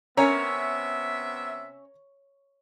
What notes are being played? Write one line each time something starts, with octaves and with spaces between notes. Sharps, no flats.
C3 B3 C#4 A#4 C#5 E5 A#5